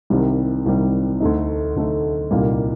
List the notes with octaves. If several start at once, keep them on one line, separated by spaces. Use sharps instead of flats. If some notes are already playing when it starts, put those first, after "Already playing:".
C2 C3 D#3 G3
C2 C3 D#3 G3
D2 D3 A3 D#4
D2 D3 A3 D#4
C2 A#2 G3 A#3 D#4